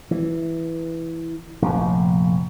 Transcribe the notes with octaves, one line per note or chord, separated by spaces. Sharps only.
E3
F1 A#1